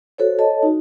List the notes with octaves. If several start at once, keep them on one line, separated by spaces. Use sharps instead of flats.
F#4 A4 C5 C#5
A4 C#5 D#5 A5
D#4 F#4